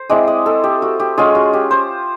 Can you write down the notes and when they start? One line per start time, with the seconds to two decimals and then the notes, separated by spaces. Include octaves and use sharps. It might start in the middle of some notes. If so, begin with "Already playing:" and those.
Already playing: C5
0.10 G#3 C4 E4 D5
0.27 D#5
0.46 A4
0.64 G4
0.82 F#4
1.00 G4
1.18 G#3 C#4 F4 G#4
1.35 F#4
1.53 G4
1.71 C5